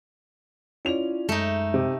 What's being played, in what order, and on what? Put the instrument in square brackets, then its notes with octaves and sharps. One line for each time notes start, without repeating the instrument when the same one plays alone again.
[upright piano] C#4 F7 [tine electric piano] E4 F4 D5
[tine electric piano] F#2 G#3 [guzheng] A3 D#4
[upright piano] C3